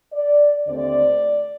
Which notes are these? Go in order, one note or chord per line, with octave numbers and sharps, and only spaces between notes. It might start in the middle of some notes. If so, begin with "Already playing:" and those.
D5
D#2 D3 A3 C4 D5